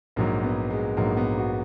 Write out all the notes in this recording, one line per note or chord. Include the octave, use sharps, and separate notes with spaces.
A#1 G#2 F#3 A#3
B3
G#3
A#1 G#2 F#3 A#3
B3
F#4